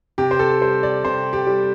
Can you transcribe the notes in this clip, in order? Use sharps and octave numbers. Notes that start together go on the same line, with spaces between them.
C3 G4
C5
A4
G3 C5
D5
C3 C5
G4
G3